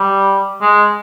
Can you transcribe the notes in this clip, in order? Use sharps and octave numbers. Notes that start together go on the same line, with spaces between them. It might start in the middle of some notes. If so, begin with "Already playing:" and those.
Already playing: G3
G#3